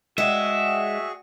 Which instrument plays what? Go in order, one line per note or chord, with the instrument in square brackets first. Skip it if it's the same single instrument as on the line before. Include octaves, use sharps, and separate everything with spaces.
[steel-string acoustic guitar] G#3 [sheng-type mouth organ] F#4 G#4 C#6 [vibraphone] D5 F#5 G5 [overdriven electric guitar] E5